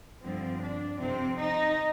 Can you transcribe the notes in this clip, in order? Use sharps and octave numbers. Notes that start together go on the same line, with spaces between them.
G2 D3 F3 C4
D4
F2 C3 F3 C4
D#4